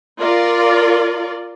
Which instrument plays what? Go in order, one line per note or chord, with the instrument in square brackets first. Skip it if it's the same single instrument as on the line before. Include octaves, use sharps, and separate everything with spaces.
[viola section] F4 A#4 D5